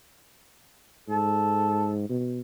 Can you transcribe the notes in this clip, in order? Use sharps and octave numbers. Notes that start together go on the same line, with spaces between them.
G#2 A4
B2